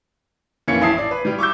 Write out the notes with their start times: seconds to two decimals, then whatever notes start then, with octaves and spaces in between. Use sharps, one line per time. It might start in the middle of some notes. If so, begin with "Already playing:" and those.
0.68 F1 E3 A#3 C#4 G#6 C#7
0.82 A1 E4 A5 D#6 C7
0.98 D5
1.11 B4
1.25 G3 G4
1.38 C#6 D6 E6 G6